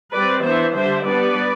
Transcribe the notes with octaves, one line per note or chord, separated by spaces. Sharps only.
G3 C4 B4 D5
E3 B3 D4 C5 E5
D3 G3 D4 C5 E5
G3 B3 D4 B4 D5